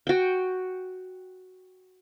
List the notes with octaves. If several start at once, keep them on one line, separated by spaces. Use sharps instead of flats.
F#4 G5